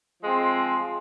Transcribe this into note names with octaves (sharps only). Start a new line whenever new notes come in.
F3 G#3 C4